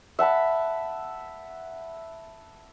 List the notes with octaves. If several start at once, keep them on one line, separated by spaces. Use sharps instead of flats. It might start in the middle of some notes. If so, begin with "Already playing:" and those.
E5 F#5 A5 B5